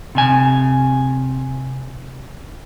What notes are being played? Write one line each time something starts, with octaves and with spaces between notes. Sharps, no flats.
C3 G#5